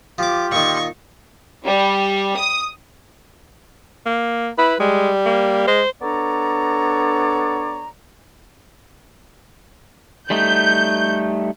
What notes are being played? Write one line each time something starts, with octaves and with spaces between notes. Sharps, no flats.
F3 F4 G4 D6
A#2 D#3 C#6
G3
D#6
A#3
E4 B4
G3 G#3
A#3
G#3 C5
B3 D4 A4 C#5 D5 A#5
G3 A3 D#4 G6